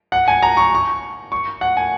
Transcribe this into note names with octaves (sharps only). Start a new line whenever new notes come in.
F#5
G#5
A#5
C#6
C#6
C#6
F#5
G#5